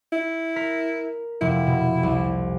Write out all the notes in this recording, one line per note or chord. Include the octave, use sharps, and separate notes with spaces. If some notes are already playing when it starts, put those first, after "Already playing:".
E4
A#4 B6
F1 E4
B2
C2